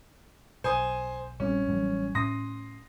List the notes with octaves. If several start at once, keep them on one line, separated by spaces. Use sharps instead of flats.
B1 C5 G#5 D#6
A#1 G3 C4 C#4
A1 F#3 G3
A2 C#4 C6 D#6 A#6